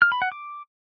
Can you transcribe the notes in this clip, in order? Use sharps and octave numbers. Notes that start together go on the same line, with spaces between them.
F6
B5
F#5
D6